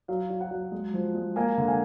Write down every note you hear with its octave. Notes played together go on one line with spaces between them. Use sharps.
F#3 F5
F#3
F#5
F#3
G#3
F3
G#3
A#3 F5 G#5
D3
F5 G#5